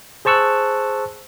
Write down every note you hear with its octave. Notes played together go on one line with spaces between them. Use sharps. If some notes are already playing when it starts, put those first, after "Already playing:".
G#4 C5 A5 C#6 E6 F#6